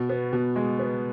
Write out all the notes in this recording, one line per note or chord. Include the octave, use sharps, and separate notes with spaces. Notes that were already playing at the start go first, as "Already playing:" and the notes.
Already playing: B2
B3
B2
G#3
B3